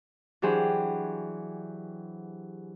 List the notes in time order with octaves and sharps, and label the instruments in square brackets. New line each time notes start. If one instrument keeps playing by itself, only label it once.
[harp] E3 F#3 D4 G4 G#4 C5